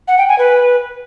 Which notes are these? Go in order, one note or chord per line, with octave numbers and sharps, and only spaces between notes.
F#5
G5
G#5
B4